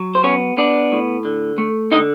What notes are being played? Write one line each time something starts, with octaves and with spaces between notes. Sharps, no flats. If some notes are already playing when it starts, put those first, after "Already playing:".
Already playing: F#3
C5
B3 C#4 C#5
B3 D4 D5
A2
D3
A3
D3 D#4 D#5